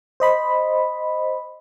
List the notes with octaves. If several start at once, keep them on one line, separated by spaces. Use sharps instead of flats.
C5 D#5 B5